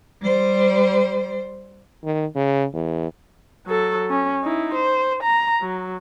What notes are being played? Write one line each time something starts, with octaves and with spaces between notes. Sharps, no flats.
G3 C5
D#3
C#3
E2
F#3 A4
C#4
D#4 E4
C5
A#5
F#3